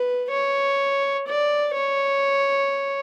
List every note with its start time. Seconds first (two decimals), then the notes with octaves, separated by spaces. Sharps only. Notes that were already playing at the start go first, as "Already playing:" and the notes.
Already playing: B4
0.31 C#5
1.27 D5
1.75 C#5